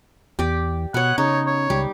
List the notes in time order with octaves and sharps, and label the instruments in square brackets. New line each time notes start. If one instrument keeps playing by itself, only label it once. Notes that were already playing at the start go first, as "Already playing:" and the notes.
[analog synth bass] E2 [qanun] G4 D5
[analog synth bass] B2 [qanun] B3 C#5 [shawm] F#5
[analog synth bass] C#3 [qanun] D#4 [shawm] C#5
[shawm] C#5
[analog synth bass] C#2 [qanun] G3